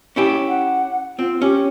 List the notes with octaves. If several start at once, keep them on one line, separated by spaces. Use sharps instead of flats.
C#4 E4 G4
F#5
C4 F4
C#4 G4